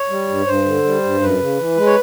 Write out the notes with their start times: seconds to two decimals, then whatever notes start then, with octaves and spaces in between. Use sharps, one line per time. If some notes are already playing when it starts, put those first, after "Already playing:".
Already playing: C#5
0.10 G3
0.29 G2
0.46 G2 C5
0.65 D3
0.85 G3
1.03 G2
1.21 F#2 B4
1.40 C#3
1.59 E3
1.77 G#3
1.86 C#5